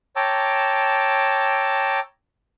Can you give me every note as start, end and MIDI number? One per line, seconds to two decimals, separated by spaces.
0.16 1.99 73
0.16 1.99 79
0.16 1.99 81
0.16 1.99 82
0.16 1.99 86
0.16 1.99 88